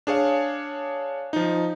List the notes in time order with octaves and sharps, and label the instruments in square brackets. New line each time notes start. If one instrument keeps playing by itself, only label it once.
[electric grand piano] D4 G#4 C#5 F5
F3 D#4